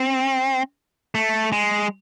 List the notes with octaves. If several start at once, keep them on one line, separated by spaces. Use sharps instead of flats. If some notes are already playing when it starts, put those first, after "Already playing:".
Already playing: C4
A3
G#3